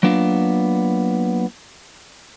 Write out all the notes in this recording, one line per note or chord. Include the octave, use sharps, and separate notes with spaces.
F#3 A#3 B3 D4 F4